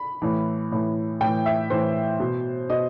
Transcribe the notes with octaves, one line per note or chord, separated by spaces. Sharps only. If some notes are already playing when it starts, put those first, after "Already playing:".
Already playing: B5
A2 E3
A2 E3
A2 E3 G5
E5
A2 E3 C5
B2
B2 D#5